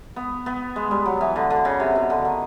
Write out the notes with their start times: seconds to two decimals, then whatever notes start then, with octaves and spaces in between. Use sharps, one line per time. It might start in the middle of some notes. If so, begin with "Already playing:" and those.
0.16 B3
0.46 B3
0.76 G#3
0.91 G3
1.06 F#3
1.21 E3
1.36 D3
1.50 D3
1.65 C#3
1.80 C3
1.95 B2
2.10 D3
2.25 D#3